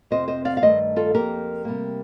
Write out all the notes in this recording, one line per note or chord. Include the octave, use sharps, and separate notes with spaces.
F2 C3 F3 C4 C5 D#5
C5 D#5
D5 F5
F5
G2 D#3 A3 C5 D#5
F4 A4
F2 C3 F3 A#3 G4 A#4
C3 G3 A#3